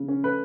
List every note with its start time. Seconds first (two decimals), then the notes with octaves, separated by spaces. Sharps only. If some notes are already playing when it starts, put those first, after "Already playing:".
Already playing: C#3
0.08 C#4
0.23 A3 B4